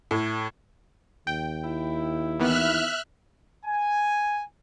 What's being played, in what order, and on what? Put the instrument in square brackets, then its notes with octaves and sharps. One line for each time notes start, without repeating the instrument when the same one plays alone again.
[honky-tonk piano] A2
[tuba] D#2 [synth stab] G5
[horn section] E4
[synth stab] D#3 E3 B3 [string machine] E5 F6 F#6
[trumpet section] G#5